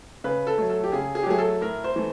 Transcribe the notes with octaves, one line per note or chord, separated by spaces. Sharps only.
C#3 B4
A4
F#3 A3
A4
G4
C#3 G#4
G#4
G4
F#3 A3 G#4
A4
A2 A#4
C5
E3 A3